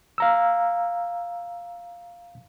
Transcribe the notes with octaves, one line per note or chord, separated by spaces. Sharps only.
F5 A#5 E6